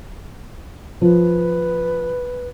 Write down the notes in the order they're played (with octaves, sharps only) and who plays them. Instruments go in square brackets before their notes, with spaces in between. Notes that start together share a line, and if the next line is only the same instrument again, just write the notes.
[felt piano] F3 [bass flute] B4